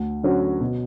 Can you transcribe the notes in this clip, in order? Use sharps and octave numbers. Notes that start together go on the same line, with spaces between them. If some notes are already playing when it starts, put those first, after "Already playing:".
Already playing: D2
D3 F#3 C#4 F#4
B2